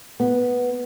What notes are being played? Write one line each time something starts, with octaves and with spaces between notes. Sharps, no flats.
B3